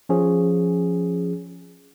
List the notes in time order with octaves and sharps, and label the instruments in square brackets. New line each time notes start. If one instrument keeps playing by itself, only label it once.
[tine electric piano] F3 C#4 G#4